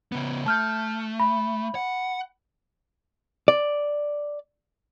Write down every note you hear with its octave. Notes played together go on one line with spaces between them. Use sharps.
C#3 B3
A3 A5 F6 G6
B5
F#5
D5